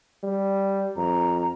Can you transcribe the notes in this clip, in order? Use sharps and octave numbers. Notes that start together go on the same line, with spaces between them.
G3
F2 A#5